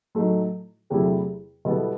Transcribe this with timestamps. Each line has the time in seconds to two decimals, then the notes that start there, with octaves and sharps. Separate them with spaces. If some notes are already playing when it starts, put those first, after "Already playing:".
0.15 A2 F#3 A3 D#4
0.90 E2 C3 F#3 A3 E4
1.65 B2 G3 B3 E4 A4